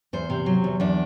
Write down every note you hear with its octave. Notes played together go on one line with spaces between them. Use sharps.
E2 C5
C3
F#3
E2
E2 D4